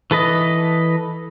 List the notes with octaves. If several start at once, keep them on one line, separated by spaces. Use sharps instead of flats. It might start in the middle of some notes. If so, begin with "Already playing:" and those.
E3 A4 B4 D#5